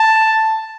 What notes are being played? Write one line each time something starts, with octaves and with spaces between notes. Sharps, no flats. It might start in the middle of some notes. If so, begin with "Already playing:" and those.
Already playing: A5